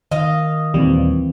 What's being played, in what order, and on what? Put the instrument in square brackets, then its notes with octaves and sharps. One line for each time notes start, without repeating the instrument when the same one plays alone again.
[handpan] D#3 [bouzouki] D#5 F5
[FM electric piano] D#2 A#2 G3 [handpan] E3 C4